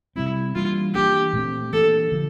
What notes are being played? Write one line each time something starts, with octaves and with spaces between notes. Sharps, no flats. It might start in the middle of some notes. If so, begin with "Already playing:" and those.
C3 G3 C4 E4
E3 G3 A#3 D4 F4
E3 A#3 D4 G4
A#2 A3 C4
E3 A#3 D4 A4
D3 F3 A#3